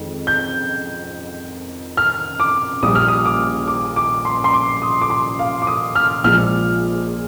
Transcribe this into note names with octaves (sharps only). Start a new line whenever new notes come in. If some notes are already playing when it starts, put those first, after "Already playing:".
Already playing: F2 D#3 G#3
G6
F6
D6
A#1 A#2 G3 D#6
F6
D#6
D6
D6
D6
C6
C6
D6
D#6
D6
C6
F5
D6
D#6
F6
A#1 A#2 F3 G#3 F6